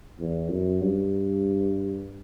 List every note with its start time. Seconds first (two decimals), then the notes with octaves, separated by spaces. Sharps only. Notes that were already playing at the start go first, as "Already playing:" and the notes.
0.20 E2
0.50 F#2
0.81 G2